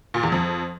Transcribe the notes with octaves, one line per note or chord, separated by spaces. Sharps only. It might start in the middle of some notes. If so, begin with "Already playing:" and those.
A#2
E2
F2